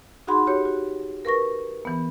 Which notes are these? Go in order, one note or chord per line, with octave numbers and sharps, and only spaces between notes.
D#4 F#4 G#4 F#5 B5 C6
F#4 G4 C#5
F#4
A#4 B4 C#6 A#6
E3 B3